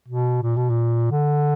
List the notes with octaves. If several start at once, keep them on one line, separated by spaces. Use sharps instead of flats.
B2
A#2
B2
A#2
D3